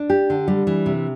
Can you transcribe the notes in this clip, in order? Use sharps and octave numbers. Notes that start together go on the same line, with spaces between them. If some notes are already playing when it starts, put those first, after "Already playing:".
Already playing: D4
G4
D3
G3
E3
C3